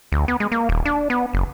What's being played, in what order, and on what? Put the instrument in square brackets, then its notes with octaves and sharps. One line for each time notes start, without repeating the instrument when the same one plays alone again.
[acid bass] D2
B3
G#3
A#3
D#1
D4
B3
F#1